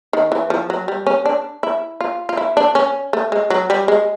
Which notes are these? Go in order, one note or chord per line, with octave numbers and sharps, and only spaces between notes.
D#3
E3
F3
F#3
G3
C#4
D4
E4
F4
F4
E4
D4
C#4
A3
G#3
F#3
G3
G#3